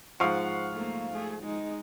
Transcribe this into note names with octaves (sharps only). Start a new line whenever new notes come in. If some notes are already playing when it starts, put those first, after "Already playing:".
G#2 F3 F5 F#5 C#6
A3 A#3
A3 G#4
G#3 D#4